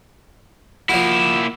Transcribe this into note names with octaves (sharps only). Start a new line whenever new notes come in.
F3 A#3 E4 F#4